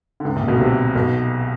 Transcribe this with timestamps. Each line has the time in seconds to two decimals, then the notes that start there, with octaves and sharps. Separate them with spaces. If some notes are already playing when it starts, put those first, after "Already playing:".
0.20 D3
0.25 C#2 C#3
0.36 A#1 A#2
0.48 B1 B2
0.59 C2 C3
0.95 B1 B2